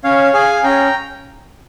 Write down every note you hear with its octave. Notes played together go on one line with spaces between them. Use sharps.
C#4 C#5 F5
G#4 F5 G#5
C#4 G5 A#5